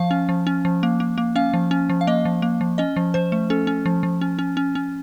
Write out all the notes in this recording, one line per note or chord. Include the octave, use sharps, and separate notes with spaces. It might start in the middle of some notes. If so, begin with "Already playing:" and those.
Already playing: F3 F5
C#4
F3
C#4
F3
A#3
A#3
A#3
C#4 F5
F3
C#4
F3
F5
A#3 D#5
F3
A#3
F3
C#4 D#5
F3
F3 C5
A3
C#4 A4
C#4
F3
F3
C#4
C#4
C#4
C#4